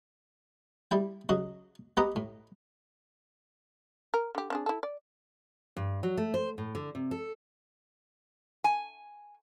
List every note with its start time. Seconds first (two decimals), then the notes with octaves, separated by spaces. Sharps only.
0.91 G3 E4 G5
1.29 C#3 F#3 F#4 D#5
1.97 B3 G4 B4 D#5 F#5 A#5
2.16 A2
4.14 A#4
4.35 D3 G4
4.50 C4 D4 G#4
4.66 E4 A4
4.83 D5
5.77 G2
6.03 F#3
6.17 A3
6.34 C5
6.58 A2
6.75 D3
6.95 C3
7.11 A4
8.64 G#5